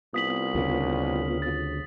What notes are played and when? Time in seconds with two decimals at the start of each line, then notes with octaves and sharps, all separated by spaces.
0.14 C2 B3 F4 D#6 B6 F#7
0.55 D2 C#3
1.42 A6